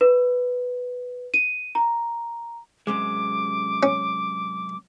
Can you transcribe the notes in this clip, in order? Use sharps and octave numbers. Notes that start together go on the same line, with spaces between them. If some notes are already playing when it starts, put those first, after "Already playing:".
B4
D#7
A#5
F#2 C3 G#3 D6
C#4